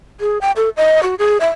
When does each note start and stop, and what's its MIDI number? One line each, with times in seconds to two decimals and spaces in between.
0.20 0.38 68
0.41 0.51 79
0.57 0.69 69
0.77 1.02 75
1.03 1.15 66
1.19 1.37 68
1.40 1.49 76